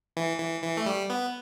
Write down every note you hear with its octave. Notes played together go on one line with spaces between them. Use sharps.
E3
E3
E3
A3
G3
B3